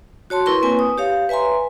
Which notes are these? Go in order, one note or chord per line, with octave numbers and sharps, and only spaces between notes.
F#4 C#5 A5 C6
E4 A#4 B4 C6 C#6
A#3 C4 B4 G#5
D#6
G4 C#5 F5
B4 E5 G#5 A#5 C6